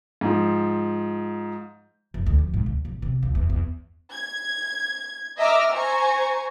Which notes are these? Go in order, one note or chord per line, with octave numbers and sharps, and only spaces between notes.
G#2 F3
F#1
D2
F3
G#2
D2
D1
C3
C#2
E2
E2
G#6
D#5 E5 A#5 D6 E6 F6
C5 G#5 A#5 C#6